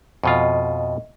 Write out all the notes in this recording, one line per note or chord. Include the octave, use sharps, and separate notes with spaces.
F2 B2 F4 D#5 E5